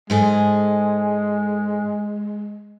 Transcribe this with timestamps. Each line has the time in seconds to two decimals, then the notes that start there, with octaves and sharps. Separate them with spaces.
0.10 G#2 G#3 G#4 A4